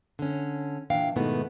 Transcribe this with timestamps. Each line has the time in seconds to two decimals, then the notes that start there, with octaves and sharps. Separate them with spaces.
0.19 D3 C#4
0.90 A#2 E3 D4 F5 G5
1.16 G#2 B2 D#3 A3 B3 E4